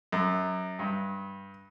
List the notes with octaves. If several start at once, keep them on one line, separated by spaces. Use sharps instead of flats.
F#2
G2